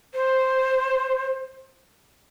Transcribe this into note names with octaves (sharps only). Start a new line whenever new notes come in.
C5